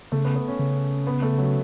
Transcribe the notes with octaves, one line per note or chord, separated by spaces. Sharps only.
C#3 A3
B3
B3
C#4
C#3
B3
A3
F#3